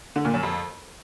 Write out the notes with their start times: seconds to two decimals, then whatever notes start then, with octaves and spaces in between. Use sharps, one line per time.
0.16 D3
0.25 A#2
0.34 F#2
0.43 F2